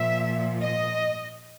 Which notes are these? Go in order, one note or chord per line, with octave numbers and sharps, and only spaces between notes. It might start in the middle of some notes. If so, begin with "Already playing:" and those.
Already playing: A#2 F3 E5
D#5